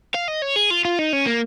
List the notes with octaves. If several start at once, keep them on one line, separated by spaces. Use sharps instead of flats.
F5
D#5
C#5
G#4
F4
F4
D#4
C#4
A#3